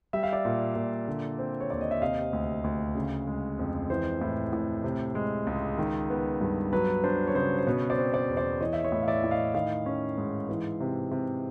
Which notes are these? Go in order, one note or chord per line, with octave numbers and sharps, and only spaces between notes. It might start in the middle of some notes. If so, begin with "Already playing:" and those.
G3 E5
F5
D5 E5
A#2
A#2
D3
C4
C#5
D#2 D5
D#5
E5
C3 D#5 F5
D2
D2
C#3
G#3
F2
E3 C5
A2
A2
C3
G#3
C#2
D#3
B3
G2
F#3 B4
D4 C5
C#5
C#3 C5
C5
B2 B4 C#5
C5 D5
C4
C5 D5
E2
C5 D5
E3 C#5 D#5
E5
C#5 D#5
A2
F5
D5 E5
A2
D#5 F5
D#3 D#5 F5
C#4
G#2
E3
C3
C3